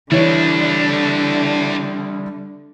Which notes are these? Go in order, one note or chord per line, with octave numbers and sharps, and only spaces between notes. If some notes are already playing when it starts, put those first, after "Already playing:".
D3 E3 G3 A3 D4 E4 C#5